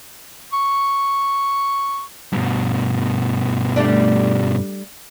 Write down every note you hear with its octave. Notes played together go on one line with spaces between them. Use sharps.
C#6
G2 B2
G3 A3 D4